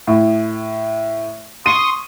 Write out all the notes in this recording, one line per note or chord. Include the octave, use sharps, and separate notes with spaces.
A2
C6 C#6 D#6 D#7